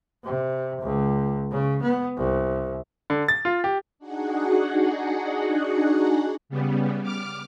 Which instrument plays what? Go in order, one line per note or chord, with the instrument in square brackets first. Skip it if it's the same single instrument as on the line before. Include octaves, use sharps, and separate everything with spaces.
[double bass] C3
C#2
C#3
B3
C2
[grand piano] D3
A6
F4
G4
[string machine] D4 D#4 F#4 G#4 F#5
C#3 G3 B3
D6 F6